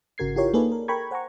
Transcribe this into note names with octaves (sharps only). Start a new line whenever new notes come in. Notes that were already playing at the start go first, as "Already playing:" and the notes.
G#1 C#3 F#4 A#4 G#6 C7
E4 F4 G4 A#4 C#5 G5
A#3 D#4 G#4 A4 B4 D5
A#4
A#4 G5 A#5 B5 C#6 G#6
C5 F#5 G#5 A#5 C#6